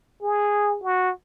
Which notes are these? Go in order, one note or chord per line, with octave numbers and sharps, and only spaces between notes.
G#4
F#4